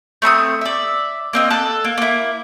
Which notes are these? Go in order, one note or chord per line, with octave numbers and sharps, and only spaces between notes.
A3 C4 B5 D#6
D5 E5
A#3 C4 D#5
A4 F#6
A#3
A#3 E4